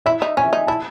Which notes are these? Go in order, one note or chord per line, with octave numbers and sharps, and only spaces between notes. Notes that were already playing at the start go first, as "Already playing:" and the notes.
E4 E5
D#4
C#4 G#5
D#4
E4 A5